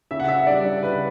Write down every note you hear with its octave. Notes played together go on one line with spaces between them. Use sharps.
C#3 E5
F#5
E5
G3 D4 D5
C#3 B4